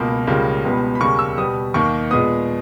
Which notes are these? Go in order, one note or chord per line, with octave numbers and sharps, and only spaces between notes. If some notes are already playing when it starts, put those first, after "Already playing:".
Already playing: C#2 B2 A#3
C#2 C#3 G3 A#3
C#2 B2 G3 B3
B5
D#2 C#3 G3 A#3 C#6
E6
B2 G3 B3 D#6
D#2 D#3 A#3 C#6
A#2 G#3 B3 D#6